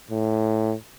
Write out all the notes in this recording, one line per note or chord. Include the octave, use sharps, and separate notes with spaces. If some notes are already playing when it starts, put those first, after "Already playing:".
A2